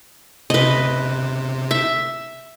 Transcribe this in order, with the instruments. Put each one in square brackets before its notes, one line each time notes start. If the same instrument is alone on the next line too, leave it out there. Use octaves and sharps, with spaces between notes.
[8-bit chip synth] C3 [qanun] B4 D#5
[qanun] E5